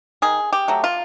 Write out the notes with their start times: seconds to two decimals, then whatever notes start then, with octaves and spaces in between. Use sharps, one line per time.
0.22 D#3 G#4
0.53 G4
0.68 F#3 A3
0.84 F4